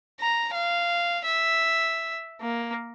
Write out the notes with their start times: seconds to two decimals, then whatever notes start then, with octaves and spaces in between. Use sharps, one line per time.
0.20 A#5
0.54 F5
1.25 E5
2.41 A#3